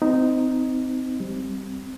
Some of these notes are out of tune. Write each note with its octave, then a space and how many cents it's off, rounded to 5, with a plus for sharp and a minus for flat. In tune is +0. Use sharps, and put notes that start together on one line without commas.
C4 -25 D#4 +0
G3 +0 C4 +0